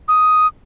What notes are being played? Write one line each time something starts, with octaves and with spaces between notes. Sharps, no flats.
D#6